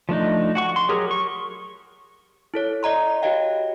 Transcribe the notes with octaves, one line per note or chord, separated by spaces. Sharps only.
F3 A3 D4 D#4
F#4 F#5 C#6
C6
F#3 G4 G#4 A#4
C#6
E4 A4 C#5
D5 D#5 A#5 C6
F#4 G4 C#5 D#5 F5 G5